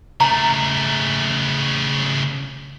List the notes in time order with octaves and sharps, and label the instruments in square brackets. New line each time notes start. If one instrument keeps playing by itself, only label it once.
[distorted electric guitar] C#3 A3 [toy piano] A#5